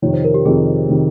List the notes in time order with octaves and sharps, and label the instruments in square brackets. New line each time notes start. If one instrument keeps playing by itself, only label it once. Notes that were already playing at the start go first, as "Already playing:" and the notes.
[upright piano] F2 C3 D#3 [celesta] C#5
[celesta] C5
A#4
G4
[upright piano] F2 C3 D#3 [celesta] G#4
[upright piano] C3 D#3